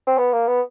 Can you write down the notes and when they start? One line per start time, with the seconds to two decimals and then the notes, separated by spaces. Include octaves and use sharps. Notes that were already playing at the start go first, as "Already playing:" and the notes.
0.07 C4
0.18 B3
0.33 A#3
0.47 B3